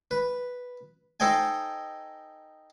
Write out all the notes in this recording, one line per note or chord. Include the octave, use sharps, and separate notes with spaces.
B4
D#4 A4 C5 D#5 G5 G#5